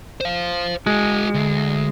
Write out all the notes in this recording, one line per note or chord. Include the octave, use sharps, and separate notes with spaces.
C5 F5
G#3 F#4 G#4
D2